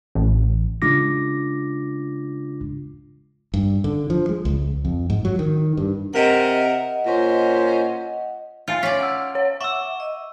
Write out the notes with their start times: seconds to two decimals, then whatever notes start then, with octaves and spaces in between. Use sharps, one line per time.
0.15 A1
0.82 C#3 G#3 D4 F4 D6 A#6
3.54 G2
3.84 D3
4.10 F3
4.29 G#3
4.45 C#2
4.85 F2
5.10 G#2
5.25 F#3
5.39 D#3
5.77 G2
6.14 C3 A#4 D#5 F#5
7.06 A#2 C#4 C5
8.68 F4 E5 F5 A6
8.83 C#4 D5 B6
9.01 F#5 E6
9.35 C#5 F#5
9.61 E5 F#5 C#6 D6 E6
10.00 D#5